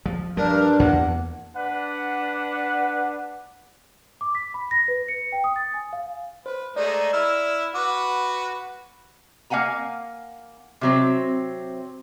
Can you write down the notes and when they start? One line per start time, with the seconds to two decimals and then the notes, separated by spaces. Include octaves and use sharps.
0.06 F3
0.37 G2 F3 G3 D4 A#4
0.80 E2 A#3 F#5
1.56 D4 B4 F#5
4.21 D6
4.35 B6
4.54 B5
4.71 A#6
4.88 B4
5.08 C#7
5.32 G5
5.44 D#6
5.56 A6
5.74 G#5
5.93 F5
6.46 B4 C5
6.76 G#3 A3 D#4 D5
7.13 E4 E6 F6
7.75 F#4 B4 D6
9.50 A#3 F5 F#5 G#5 A#5
10.81 C3 F#3 C4